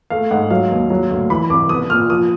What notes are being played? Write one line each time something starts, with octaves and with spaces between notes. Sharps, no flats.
A3 F5
G#2 F#5
F#3 F5
D#2
F#3
D2
E3 B5
C2 D6
B3 D#6
A#2 F6
F3 D#6